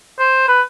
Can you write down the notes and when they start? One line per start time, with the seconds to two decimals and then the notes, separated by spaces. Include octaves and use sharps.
0.19 C5
0.48 B4